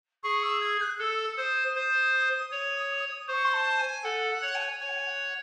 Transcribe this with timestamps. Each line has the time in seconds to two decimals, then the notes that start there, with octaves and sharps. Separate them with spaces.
0.23 G#4 C#6
0.42 E6
0.61 G#6
0.81 F#6
0.99 A4 E6
1.37 C5 D#6
1.75 C5
2.52 C#5
3.28 C5 C#6
3.44 C6
3.53 A5
3.79 G#5
4.04 A4 F#5
4.30 F#5
4.42 C#5
4.55 A5
4.59 G#5
4.80 C#5 G#5
4.88 F#5
4.96 G#5
5.06 F#5